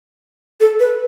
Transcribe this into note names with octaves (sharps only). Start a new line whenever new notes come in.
A4
B4